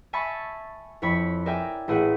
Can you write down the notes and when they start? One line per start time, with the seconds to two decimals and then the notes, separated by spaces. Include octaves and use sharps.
0.13 E5 G#5 A5 B5 C#6 A6
1.02 F2 E4 C#5 B5 B6
1.46 A#4 D5 E5 G5 G#5
1.88 A1 A#2 A3 E4 G#4 F#5